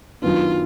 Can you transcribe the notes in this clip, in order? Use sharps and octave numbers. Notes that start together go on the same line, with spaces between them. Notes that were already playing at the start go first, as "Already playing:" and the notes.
F#2 D#3 F#3 B3 D4 F4